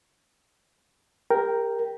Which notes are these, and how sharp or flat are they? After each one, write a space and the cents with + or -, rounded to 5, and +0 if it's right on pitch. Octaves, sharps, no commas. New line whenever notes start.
G4 +40 A#4 +0 G5 +0